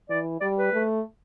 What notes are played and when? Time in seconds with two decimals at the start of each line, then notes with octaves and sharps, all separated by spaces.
0.10 E3 D5
0.41 G3 D5
0.58 B4
0.73 A3